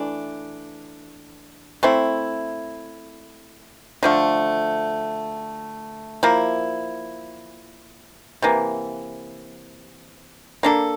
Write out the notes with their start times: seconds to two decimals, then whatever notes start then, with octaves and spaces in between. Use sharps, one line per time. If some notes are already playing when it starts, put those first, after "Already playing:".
Already playing: E3 A3 D4
1.83 A3 C4 E4
4.03 D3 F3 A3
6.23 F3 A#3 E4
8.42 C3 E3 A#3
10.63 A#3 D4 A4